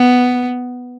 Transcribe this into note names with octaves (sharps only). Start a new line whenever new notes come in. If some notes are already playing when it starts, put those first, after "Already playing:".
Already playing: B3